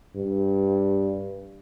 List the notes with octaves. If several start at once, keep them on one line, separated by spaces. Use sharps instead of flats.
G2